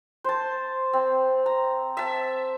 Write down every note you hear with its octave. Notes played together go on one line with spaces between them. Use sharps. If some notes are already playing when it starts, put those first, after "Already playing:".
C5 A5
C4
A#5
E5 A5